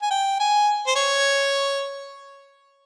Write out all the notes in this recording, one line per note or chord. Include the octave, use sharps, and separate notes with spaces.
G#5
G5
G#5
C5
C#5